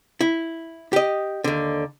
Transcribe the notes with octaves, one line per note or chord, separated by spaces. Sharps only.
E4
G4 D#5
D#2 D3